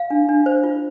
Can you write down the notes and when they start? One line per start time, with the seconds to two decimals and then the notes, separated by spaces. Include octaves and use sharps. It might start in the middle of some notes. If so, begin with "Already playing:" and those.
Already playing: F5
0.10 D4
0.29 D4
0.46 C5
0.64 F4